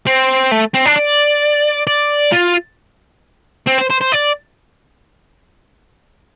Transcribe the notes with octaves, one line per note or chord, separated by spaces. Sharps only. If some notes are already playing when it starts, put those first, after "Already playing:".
C4
A3
C4
D4
D5
D5
F4
C4
C5
C5
C5
D5